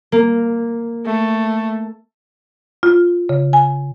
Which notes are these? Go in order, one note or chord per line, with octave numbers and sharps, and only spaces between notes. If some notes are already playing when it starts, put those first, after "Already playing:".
A#3
A3
F4
C#3
G#5